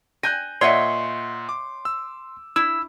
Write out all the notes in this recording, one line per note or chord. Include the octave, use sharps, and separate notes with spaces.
G#5 F#6 G6 A#6
A#2 C#5 D#5 E5 F#5 C6 C#7
D6
E6
E4 E6